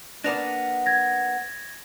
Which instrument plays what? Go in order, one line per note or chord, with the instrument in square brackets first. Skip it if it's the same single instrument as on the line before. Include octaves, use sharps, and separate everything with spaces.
[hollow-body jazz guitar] A#3 B3 D4 [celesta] A#6 F7
[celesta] G#6 A#6